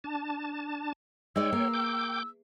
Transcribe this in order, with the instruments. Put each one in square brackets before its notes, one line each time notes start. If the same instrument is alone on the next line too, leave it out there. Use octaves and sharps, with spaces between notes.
[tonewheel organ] D4 A5
[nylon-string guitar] G#3 D#4 D5 [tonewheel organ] C#5 G5 [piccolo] E6
[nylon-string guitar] A#3
[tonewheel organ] G5 D6 G6